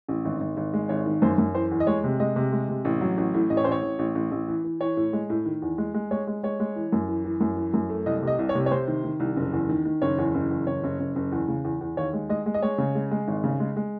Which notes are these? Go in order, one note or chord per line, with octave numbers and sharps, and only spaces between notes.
A1
G#1
G#1
G#1
G#3
G#1 C#5
D#3
F#2 C5
F#2
E3 C5
E2
D#5
G#3 C#5
C3
G#3 D#5
C3
G#3
C3
A1
F#3
A1
A2
A1 D#5
C#5
A1 C5
C#5
A1
A1
A1
A1
E3
E3
E3 C#5
A2
G#3
A2
D#3
E2
G#3
G#3
G#3 C#5
G#3
G#3 C#5
G#3
E3
F#2
E3
E3
F#2
E3
F#2
A3
C2 D#5
C3
D#5
C2
C#5
C3
C#5
C3 C5
D#3
D#3
C2
F#1
E2
D#3
D#3
F#1 C#5
E2
F#1
E2
F#1 C#5
F#1
F#1
F#1
E2
C#3
E2
E2
D#2 C#5
G#3
G#3 D#5
G#3
D#5
G#3 C#5
C#3
G#3
G#3
G#1
C#3
G#3
G#3